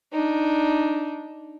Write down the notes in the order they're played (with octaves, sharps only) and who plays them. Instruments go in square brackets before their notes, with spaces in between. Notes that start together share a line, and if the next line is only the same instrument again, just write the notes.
[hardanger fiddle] D4 D#4